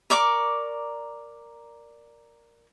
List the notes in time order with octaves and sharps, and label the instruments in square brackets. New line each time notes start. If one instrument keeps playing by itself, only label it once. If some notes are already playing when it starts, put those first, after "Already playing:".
[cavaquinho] A#4 D5 C#6 D6